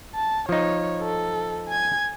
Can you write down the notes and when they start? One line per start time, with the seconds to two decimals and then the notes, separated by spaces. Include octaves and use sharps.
0.15 A5
0.49 F3 D#4 C#5
1.03 A4
1.68 G#5 G#6